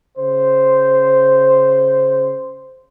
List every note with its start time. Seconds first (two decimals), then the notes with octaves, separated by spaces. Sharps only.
0.18 C#3 C5